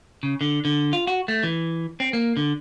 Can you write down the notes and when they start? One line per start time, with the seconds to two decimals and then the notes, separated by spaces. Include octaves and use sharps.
0.23 C#3
0.41 D3
0.65 D3
0.93 F4
1.07 F#4
1.28 A3
1.43 E3
2.00 C4
2.13 A#3
2.37 D3